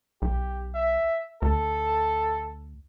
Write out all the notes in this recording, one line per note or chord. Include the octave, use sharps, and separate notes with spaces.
B1 G4
E5
D2 A4